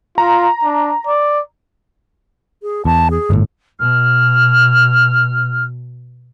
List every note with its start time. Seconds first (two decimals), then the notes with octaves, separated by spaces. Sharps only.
0.18 F4 A#5
0.64 D4
1.07 D5
2.63 G#4
2.85 E2 A5
3.11 G#4
3.30 G1 A2
3.79 B2 F6